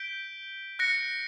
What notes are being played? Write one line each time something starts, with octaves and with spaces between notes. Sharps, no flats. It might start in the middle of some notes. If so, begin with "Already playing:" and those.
Already playing: G6 B6 D7 G7
F#6 A#6 C#7